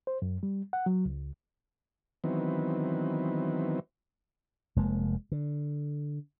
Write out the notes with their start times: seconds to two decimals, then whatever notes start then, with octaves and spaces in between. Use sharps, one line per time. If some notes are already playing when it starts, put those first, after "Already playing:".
0.07 C5
0.22 F#2
0.43 G3
0.73 F#5
0.86 F#3
1.05 C#2
2.24 D#3 E3 F#3 B3 C4
4.76 F1 G#3 A#3
5.32 D3